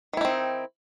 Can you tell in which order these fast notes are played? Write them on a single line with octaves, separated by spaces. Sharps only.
D#3 E4 D#4 C4